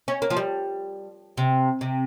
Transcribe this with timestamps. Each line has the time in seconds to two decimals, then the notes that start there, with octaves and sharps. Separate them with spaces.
0.08 C#4
0.22 A#3
0.30 F3
0.37 G3
1.37 C3
1.81 C3